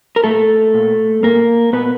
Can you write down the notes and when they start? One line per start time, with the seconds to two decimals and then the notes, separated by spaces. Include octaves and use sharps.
0.16 A#4
0.24 A#2 A3 A4
0.74 A#2
1.23 A#2 A#3 A#4
1.73 A#2 B3 B4